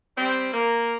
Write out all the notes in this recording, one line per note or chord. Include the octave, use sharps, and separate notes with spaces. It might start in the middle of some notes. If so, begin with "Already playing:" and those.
G3 C4
A#3